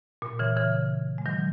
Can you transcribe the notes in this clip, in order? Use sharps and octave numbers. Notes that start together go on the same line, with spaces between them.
A#2
C#3 E3
C#3 E3
G#3
D#3 F#3